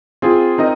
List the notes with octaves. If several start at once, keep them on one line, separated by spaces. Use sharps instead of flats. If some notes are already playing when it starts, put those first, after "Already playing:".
C4 F4 G#4
C4 D#4 A#4 D#5